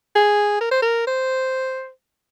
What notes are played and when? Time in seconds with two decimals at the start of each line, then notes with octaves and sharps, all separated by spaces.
0.15 G#4
0.61 A#4
0.71 C5
0.82 A#4
1.07 C5